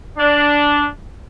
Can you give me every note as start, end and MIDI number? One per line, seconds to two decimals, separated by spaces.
0.18 0.85 62